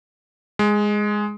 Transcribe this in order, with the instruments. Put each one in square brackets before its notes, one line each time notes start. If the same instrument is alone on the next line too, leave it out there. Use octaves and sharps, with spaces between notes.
[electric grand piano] G#3